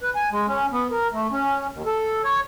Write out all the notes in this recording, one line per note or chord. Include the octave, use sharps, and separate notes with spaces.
B4
G#5
G#3
C#4
B3
A#4
A3
C#4
D#2
A4
C#5